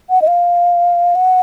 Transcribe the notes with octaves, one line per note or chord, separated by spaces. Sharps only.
F#5
D#5
F5
F#5